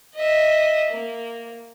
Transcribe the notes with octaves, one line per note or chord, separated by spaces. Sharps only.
D#5 E5
A#3